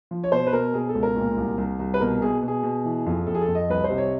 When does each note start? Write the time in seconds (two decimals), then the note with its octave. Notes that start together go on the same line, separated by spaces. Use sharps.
0.11 F3
0.24 C#5
0.32 B2 C5
0.47 B4
0.53 B2 A#4
0.74 B2 G#4
0.89 A4
0.95 C#2
1.03 A#4
1.16 A#2
1.37 C2
1.58 C2
1.79 C2
1.94 B4
2.00 B2 A#4
2.22 B2 G#4
2.43 B2
2.48 G#4
2.63 B2
2.85 E3
3.06 F2
3.27 F2 A4
3.35 G#4
3.41 A4
3.48 F2
3.55 D#5
3.69 C2 B4
3.84 C5
3.90 C3
3.98 C#5